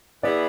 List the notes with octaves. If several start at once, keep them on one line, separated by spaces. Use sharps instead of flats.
E3 B3 E4 G#4 B4 D5